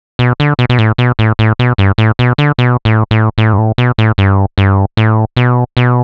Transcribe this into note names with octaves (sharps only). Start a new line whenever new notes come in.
B2
D3
B2
B2
A2
B2
A2
A2
B2
G2
A2
B2
D3
B2
A2
A2
A2
G2
A2
B2
A2
G2
G2
A2
B2
B2